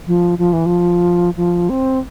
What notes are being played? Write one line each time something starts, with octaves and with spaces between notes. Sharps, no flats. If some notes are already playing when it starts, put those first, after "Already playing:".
F3
F3
E3
F3
F3
C4